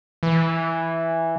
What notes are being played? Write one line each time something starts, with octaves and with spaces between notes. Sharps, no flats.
E3